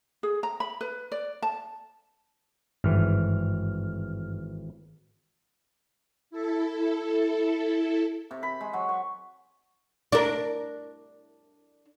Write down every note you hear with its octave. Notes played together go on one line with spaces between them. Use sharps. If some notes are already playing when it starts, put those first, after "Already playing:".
G#4
A#5
B5
B4
D5
A5
G#1 G2 E3 F6
E4 A4
C3
B5
G#3
F#3
C#6
D4 A#4